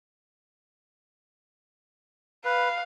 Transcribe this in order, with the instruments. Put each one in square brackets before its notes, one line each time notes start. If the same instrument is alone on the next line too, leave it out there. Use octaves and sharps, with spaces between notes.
[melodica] B4 [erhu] F5